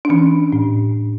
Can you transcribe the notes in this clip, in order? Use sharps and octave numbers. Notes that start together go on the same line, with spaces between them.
D4
E3 C#4
A2